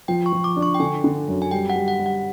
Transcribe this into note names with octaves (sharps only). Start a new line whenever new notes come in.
F3 G5
C#6
F3
D6
D4
C#6
G5
D3 G#5
D3
F#2
G#5
G3 G5
F#5
G3
F#5
G3
F#5